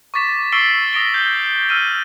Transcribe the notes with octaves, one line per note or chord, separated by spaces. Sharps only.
C#6 D6 A6 B6 E7
C#6 E6 A6 C7 D7 G7
D#6 A#6 D7 G7
G6 G7
E6 F6 D#7 G7